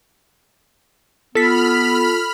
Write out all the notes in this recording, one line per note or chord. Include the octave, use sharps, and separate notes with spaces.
B3 F4 A4 B5 F6 B6